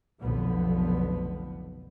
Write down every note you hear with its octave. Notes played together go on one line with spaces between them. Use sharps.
F1 B1 B2 D3 F3 B3